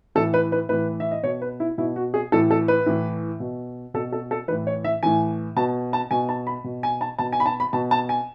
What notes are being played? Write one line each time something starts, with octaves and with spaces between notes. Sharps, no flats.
A2 E3 A4
B4
B4
A2 E3 B4
E5
D#5
B2 C#5
B4
E4
B2 E4
F#4
G#4
A2 E3 A4
A4
B4
A2 E3
B2
B2 A4
A4
A4
A2 E3 B4
C#5
E5
A2 E3 G#5
B2 A5
A5
B2 G#5
A5
B5
B2
G#5
A5
B2 A5
G#5
B5
A5
B5
B2 A5
A5
G#5